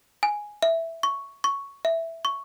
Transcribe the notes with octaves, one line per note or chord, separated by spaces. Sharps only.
G#5
E5
C#6
C#6
E5
C#6